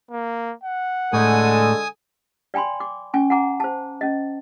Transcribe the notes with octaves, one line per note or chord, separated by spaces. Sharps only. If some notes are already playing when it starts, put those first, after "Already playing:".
A#3
F#5
A2 D3 G#3 A4 G#5 D#6
D5 G5 G#5 B5 C6
D6
C#4 G#5 C#6
F#5 G#5 A#5 D6
C5 A5
C#4 D#5